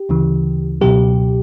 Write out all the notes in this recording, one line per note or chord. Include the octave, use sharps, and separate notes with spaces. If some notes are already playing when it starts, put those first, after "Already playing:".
Already playing: G4
D2 C#3 E3
C#2 B2 F#3 G4